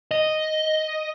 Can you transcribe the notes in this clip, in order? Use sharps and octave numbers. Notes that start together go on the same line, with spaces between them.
D#5